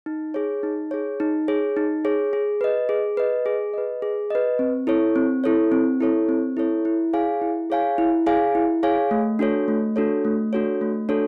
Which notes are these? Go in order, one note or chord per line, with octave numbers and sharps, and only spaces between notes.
D#4
G#4 C#5
D#4
G#4 C#5
D#4
G#4 C#5
D#4
G#4 C#5
G#4
B4 D#5
G#4
B4 D#5
G#4
B4 D#5
G#4
B4 D#5
C4
E4 A4 C#5
C4
E4 A4 C#5
C4
E4 A4 C#5
C4
E4 A4 C#5
E4
G#4 C#5 F5 G#5
E4
G#4 C#5 F5 G#5
E4
G#4 C#5 F5 G#5
E4
G#4 C#5 F5 G#5
A3
D4 F#4 A4 C#5
A3
D4 F#4 A4 C#5
A3
D4 F#4 A4 C#5
A3
D4 F#4 A4 C#5